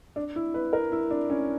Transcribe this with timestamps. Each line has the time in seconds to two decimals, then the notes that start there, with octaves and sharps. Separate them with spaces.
0.16 D4
0.36 E4
0.54 B4
0.73 A#4
0.92 E4
1.11 D4
1.30 C#4